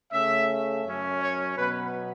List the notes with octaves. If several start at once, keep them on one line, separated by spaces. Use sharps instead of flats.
C#3 A3 C#4 E5
F#2 F#3 C#4
C#5
B2 F#3 B3 B4